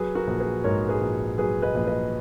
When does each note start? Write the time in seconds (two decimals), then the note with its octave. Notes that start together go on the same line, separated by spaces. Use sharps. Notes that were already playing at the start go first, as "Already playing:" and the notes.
Already playing: F#3 G#4 B4
0.15 F#4 A#4
0.27 A#1
0.40 G#4 B4
0.64 G#2 A#4 C#5
0.88 G#4 B4
1.01 A#1
1.38 F#3 G#4 B4
1.62 B4 D#5
1.75 A#1
1.86 B4 D#5